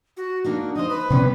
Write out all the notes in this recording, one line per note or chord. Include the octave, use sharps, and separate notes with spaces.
F#4
A#3 D4 D#4 F#4
D#4 C5 D#5
B4
C3 G3 B3 C#4